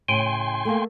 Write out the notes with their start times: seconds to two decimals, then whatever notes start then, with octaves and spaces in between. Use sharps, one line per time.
0.08 A2 C#3 G5 G#5 C6
0.65 A3 A#3